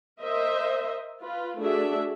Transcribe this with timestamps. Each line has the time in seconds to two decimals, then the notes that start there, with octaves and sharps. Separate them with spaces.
0.21 A#4 C5 D#5 E5
1.21 F4 B4
1.59 A3 D4 F#4 G#4 E5